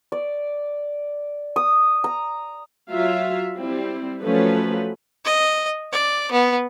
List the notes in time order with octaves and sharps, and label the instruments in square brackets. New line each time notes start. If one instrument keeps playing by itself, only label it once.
[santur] D5
D#6
A#5
[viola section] F#3 F4 E5 F5
G3 C4 E4
F3 F#3 A3 C#4 A4 B4
[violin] D#5
D5
B3